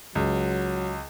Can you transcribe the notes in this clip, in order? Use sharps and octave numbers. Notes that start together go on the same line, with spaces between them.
C#2 F#3